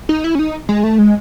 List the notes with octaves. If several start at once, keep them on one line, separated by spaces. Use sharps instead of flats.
D#4
E4
C#4
D#4
G#3
A3
G#3